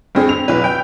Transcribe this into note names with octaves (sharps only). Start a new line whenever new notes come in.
G2 C4 G#4
F7
B1 B4
G5